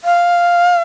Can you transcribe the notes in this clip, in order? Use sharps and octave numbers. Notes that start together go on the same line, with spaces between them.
F5